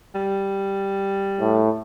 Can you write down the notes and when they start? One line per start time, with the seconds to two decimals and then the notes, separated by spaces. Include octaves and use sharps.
0.15 G3
1.41 A2